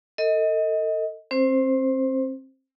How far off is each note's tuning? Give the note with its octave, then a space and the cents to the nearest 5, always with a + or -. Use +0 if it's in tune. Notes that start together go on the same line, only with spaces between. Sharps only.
A4 +35 D#5 +20
C4 +30 C5 +0